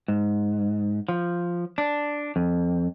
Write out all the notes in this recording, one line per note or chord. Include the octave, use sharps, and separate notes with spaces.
G#2
F3
D4
F2